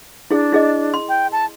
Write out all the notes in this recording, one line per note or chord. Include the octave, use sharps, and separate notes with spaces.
D4 E4 G#4
E4 G#4 D#5
C6
G5
A5